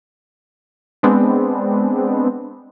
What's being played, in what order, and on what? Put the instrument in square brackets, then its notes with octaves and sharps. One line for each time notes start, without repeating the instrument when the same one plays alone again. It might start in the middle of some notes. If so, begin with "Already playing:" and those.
[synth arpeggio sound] G#3 B3 C4 D4